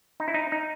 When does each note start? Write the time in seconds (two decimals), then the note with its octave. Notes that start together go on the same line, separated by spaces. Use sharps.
0.20 D#4
0.28 E4
0.34 D#4
0.52 D#4